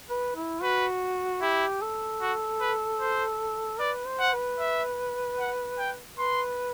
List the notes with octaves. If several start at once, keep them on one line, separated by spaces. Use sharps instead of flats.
B4
E4
F#4 B4
E4 G4
A4
F#4
B4
C5
B4 D5
C5
F#5
B4
E5
F#5
G5
B4 C6